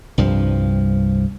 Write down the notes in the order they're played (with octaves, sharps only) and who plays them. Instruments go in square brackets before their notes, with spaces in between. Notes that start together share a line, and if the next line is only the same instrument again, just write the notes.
[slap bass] C2 G2 F3